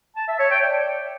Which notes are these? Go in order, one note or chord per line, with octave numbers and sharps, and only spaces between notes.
A5
E5
C#5
G5
D5